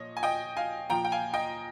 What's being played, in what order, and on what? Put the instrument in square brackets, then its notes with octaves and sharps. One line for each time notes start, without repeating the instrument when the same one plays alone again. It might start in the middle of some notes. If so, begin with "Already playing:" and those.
Already playing: [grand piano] A#2 F3 C#5 D#5
G#5
D#5 G5
F5 G#5
A#2 F3 G5 A#5
G5
F5 G#5
D#5 G5